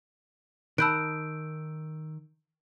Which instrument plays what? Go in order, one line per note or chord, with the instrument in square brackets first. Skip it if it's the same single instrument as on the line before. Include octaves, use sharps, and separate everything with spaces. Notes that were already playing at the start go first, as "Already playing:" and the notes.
[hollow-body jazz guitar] D#3 [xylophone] A5 B5 F#6 [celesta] E6 G6 D7